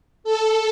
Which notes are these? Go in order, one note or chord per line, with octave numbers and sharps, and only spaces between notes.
A4